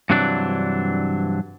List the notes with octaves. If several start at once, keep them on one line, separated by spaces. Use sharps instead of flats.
G2 C3 E3 F#3 D4